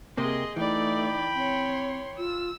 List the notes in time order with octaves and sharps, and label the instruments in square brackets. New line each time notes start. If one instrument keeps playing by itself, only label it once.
[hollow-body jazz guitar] C3 A#3 C4 [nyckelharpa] G#4 D#5 [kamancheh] C6
[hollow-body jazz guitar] E3 [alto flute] A3 [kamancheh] D#4 D5 [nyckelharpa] G5 B5
[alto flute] C4 [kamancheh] C#5 C6
[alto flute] F4 [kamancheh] E6